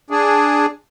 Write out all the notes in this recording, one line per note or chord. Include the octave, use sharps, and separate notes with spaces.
D4 G#4